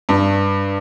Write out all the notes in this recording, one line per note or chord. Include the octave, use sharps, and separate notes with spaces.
G2